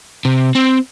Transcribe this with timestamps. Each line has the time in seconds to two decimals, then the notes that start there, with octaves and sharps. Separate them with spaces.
0.25 C3
0.55 C4